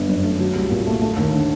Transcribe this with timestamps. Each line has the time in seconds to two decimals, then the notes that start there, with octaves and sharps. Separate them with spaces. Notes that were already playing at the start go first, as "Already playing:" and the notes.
Already playing: G1 D3
0.09 F#2
0.24 A3
0.40 F#3
0.55 C2
0.70 A#2
0.86 A3
1.02 A3
1.17 D#2
1.32 D3